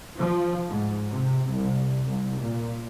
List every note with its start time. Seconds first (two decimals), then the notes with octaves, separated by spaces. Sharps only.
0.19 F3
0.69 G#2
1.10 C3
1.50 C2
2.06 C2
2.40 A#2